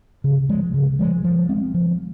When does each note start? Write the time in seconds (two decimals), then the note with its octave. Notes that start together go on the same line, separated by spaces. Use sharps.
0.24 C#3
0.49 F3 G#3
0.74 C#3
0.99 F3 G#3
1.24 F3
1.49 G#3 C4
1.74 F3